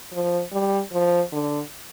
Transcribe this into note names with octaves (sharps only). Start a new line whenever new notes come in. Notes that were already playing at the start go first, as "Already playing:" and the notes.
F3
G3
F3
D3